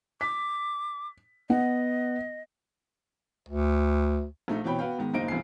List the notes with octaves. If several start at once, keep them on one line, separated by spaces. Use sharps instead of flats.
D6 B6
B3 D#5 F#5
D2
A#1 A3 D#4
B2 E3 C4 C#5 G5 B5
B3 F#4 B4 F5 G5
G#2 D#3 B3
F#1 A#3 D#4 C5 D#5 D7
F1 A#1 E3 B3 G#5 C7